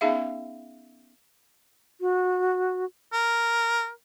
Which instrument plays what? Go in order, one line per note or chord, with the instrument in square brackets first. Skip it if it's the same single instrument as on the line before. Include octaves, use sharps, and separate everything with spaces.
[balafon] B3 C#4 D#4 G#4 E5 F5
[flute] F#4
[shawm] A#4